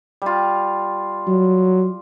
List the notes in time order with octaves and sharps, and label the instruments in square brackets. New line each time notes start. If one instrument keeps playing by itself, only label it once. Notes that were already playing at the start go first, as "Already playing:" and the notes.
[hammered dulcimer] G3 F4
[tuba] F#3